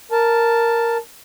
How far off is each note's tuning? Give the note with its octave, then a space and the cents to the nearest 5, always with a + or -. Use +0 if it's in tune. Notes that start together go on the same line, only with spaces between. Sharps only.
A#4 +0 A5 +0